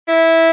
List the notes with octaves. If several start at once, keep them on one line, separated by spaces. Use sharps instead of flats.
E4